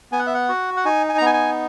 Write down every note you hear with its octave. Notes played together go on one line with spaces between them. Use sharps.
B3 G#5
F#5
E5
F#5
F#4
F#5
D#4 G#5
G#5
A#5
B3 G#5
G#5